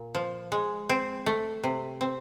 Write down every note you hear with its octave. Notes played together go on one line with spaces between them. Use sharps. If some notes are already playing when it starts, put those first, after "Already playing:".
Already playing: A#2
F3
G#3
C4
A3
C3
C4